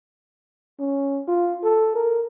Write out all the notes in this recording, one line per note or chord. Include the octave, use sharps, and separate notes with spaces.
C#4
F4
A4
A#4